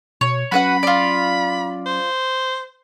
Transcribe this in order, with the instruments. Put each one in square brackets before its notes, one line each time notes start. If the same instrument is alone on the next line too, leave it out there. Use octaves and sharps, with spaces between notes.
[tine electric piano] B2 [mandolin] C#5
[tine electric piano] F#3 C#4 [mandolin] F#4 B4 F#5 [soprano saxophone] B5
[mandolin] F4 D5
[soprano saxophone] C5